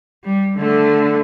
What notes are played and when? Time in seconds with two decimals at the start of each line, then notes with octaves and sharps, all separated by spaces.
0.24 G3
0.58 D3 A3